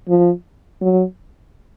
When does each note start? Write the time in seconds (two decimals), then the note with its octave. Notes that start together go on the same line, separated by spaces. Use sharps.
0.09 F3
0.81 F#3